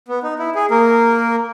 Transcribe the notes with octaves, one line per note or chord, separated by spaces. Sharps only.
B3
D#4
E4
G#4
A#3 A#4